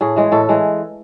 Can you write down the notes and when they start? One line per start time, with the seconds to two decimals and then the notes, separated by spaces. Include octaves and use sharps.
0.01 A2 G#4
0.16 E3 G#3
0.32 A2 A4
0.49 E3 G#3